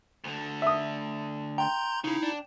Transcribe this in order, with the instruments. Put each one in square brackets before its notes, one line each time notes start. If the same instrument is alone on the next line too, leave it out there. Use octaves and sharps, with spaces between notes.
[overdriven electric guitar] D2 D3
[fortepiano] E5 D#6
[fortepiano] G5 [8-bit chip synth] A#5 C6 G6
[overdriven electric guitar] C#3 [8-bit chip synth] D#4 E4
[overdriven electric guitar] D4